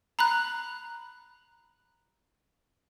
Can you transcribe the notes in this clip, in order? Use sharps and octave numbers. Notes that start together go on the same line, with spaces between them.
A#5 B5 F#6